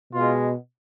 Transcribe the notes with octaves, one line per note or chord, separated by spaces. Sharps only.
B2 G#3 F4